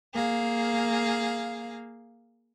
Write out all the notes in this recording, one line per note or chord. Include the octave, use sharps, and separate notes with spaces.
A#3 G#4 F5